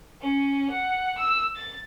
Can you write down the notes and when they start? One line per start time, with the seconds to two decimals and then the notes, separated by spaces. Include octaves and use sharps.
0.21 C#4
0.70 F#5
1.17 E6
1.55 A6